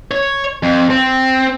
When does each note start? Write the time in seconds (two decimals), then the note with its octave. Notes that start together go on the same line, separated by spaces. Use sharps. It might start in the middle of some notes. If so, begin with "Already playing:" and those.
0.11 C#5
0.63 F2
0.90 C4